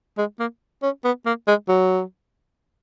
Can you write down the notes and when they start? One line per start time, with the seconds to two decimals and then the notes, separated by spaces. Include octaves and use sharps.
0.18 G#3
0.39 A#3
0.83 C#4
1.04 B3
1.26 A#3
1.47 G#3
1.68 F#3